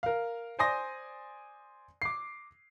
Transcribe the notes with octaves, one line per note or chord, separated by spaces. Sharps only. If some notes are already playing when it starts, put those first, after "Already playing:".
A#4 F5
C5 D5 G#5 C6 D#6 A#6
D6 C7